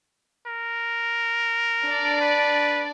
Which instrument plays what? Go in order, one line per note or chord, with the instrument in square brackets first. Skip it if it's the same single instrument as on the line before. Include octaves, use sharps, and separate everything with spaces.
[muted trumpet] A#4
[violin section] D4 D5
[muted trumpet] B4